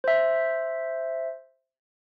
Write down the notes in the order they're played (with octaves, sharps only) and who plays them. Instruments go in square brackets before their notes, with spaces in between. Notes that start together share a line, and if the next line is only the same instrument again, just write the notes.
[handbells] C5 E5